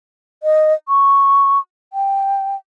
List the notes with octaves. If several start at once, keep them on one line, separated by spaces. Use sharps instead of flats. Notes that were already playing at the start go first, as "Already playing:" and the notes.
D#5
C#6
G5